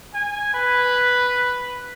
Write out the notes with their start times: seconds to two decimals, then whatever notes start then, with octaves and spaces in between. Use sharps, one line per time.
0.14 G#5
0.54 B4